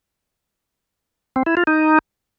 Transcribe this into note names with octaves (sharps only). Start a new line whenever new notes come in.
C4
E4
F4
D#4